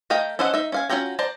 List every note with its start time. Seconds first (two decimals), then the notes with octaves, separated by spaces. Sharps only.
0.10 A3 D#5 F5 G5 A#5
0.39 C#4 A4 C5 D#5 F#5
0.54 D#4 E5
0.72 C#4 F5 G#5
0.89 C#4 F4 F#4 G5 A#5
1.19 C5 D5 A5 A#5